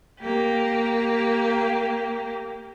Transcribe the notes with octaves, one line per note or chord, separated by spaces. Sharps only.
A#3 G4